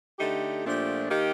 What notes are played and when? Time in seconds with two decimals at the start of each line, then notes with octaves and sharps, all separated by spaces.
0.19 D3 A3 D#4 G4
0.64 A#2 F3 A3 D4 G4
1.09 D#3 A#3 D#4 G4